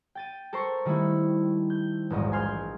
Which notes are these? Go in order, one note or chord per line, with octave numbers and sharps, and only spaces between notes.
G5 A6 D#7
A4 A#4 C5 C6 C#6
D#3 G3 A3 D#4 E4
G6
E1 A#1 G#2 D#5
G#5 C6 F6 G6